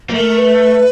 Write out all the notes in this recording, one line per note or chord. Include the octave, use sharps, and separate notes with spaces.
A#3
A3 A#4
B4